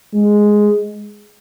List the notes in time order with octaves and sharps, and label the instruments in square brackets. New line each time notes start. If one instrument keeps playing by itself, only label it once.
[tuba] G#3